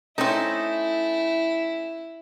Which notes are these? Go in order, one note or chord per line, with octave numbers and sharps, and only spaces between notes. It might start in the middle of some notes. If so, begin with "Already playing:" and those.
A3 C4 C#4 D#4 E4